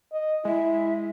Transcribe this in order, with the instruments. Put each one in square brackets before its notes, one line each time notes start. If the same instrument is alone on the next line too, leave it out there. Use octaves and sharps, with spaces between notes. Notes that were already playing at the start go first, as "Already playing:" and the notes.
[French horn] D#5
[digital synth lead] G#3 [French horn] E4 [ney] E5